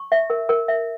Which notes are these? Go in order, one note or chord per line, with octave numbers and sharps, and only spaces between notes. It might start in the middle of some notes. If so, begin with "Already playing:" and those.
Already playing: C#6
E5
A#4
A#4
E5